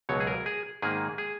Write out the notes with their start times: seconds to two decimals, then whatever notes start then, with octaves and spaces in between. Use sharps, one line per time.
0.09 C#2 B2 F#3 C#5
0.20 G#4
0.27 A#4
0.46 G#4
0.82 G#2 D#3 A#3 G#4
1.18 G#4